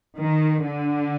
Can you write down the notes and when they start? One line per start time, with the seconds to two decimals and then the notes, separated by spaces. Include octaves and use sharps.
0.18 D#3
0.66 D3